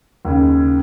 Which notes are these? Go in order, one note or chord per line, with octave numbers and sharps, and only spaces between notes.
D#2 C#3